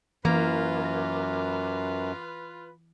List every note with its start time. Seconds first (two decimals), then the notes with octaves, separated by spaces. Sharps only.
0.25 F#2 E3 A#3 F4 B4